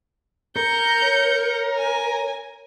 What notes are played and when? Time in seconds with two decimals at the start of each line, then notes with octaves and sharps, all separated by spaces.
0.56 A#4 G6 C#7
1.02 C#5
1.78 G#5